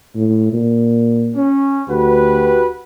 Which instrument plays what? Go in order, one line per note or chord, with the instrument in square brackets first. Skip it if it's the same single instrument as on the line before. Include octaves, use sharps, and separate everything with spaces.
[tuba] A2
A#2
[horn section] C#4
[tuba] D2 [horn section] F#4 G4 B4